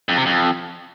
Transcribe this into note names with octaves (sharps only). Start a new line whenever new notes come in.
F2
C3
F2